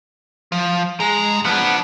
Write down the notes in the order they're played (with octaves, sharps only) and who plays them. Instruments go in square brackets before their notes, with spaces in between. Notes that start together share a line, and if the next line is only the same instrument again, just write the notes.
[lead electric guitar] F3
[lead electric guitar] G2 A#5 [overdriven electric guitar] G#3
[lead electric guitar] F3 D4 [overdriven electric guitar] B4 F#5